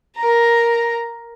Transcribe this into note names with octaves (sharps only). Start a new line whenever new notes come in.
A#4 A#5